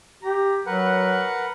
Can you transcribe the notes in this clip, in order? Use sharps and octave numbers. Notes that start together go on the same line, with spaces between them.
G4 A#5
F#3 A#4 B4 F#5